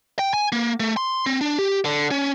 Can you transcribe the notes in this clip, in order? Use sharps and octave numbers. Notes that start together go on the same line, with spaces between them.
G5
G#5
A#3
A3
C6
C4
D4
G4
D3
C#4